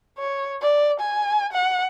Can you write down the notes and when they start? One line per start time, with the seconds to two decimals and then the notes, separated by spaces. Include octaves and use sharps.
0.18 C#5
0.61 D5
1.00 G#5
1.53 F#5